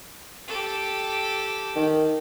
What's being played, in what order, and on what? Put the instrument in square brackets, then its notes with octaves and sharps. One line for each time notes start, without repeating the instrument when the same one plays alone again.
[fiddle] G4 A4
[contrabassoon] D#3